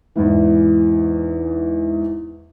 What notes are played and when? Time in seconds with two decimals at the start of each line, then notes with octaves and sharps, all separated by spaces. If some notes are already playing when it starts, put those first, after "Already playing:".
0.16 E2 G#2 E3